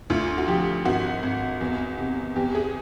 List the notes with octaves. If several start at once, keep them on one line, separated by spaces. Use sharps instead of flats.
D2 F4
F#4
F3 G4
G#1 F#4
G#1
E2
C3
E2 G4
G#4